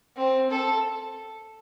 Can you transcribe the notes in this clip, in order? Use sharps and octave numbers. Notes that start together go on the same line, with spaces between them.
C4
A4